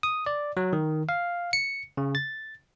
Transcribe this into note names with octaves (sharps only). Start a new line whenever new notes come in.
D#6
D5
F#3
D#3
F5
C#7
C#3
A6